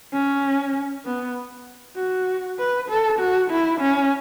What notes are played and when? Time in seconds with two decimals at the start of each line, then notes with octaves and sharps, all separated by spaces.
0.13 C#4
1.05 B3
1.97 F#4
2.59 B4
2.89 A4
3.19 F#4
3.51 E4
3.81 C#4